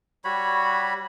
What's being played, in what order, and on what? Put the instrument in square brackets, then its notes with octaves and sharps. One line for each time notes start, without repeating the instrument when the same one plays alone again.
[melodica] G3 F#4 C#5 B5